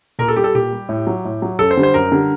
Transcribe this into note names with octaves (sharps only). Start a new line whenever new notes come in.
A#2 A#4
A4
G3 G4
A4
A#2 G4
G3
A2
F#3
A2
F#3
F#2 A4
C5
D3 G3
C5
F#2 A#4
D3 G3